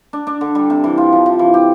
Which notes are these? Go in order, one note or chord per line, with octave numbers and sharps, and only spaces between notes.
D4
D4
D3
G3
C3
E3
F4
F3
F3
E3
G4